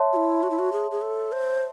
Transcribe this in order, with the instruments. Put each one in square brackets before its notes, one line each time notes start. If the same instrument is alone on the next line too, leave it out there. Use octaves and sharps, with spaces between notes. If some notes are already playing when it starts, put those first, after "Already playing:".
Already playing: [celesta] C#5 E5 A5 C6
[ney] F#4
E4
F#4
E4
F#4
G#4
G#4
A4
C5